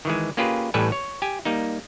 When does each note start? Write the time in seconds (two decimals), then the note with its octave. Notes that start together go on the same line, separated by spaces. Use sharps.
0.05 D#3 E3 G#3
0.37 A#3 C#4 F4 G4 G#4 B4
0.74 A1 A2 G3 A4 B4 G#5
0.92 C#5
1.22 G4 G#5
1.45 G3 A#3 D#4